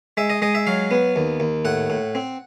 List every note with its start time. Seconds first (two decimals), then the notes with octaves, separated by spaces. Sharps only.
0.17 G#3 E5
0.30 D#5
0.42 G#3 D#5
0.55 E5
0.67 F#3 F5
0.91 B3
1.16 D#2
1.40 D#2
1.65 A2 F#5
1.90 A2
2.15 C4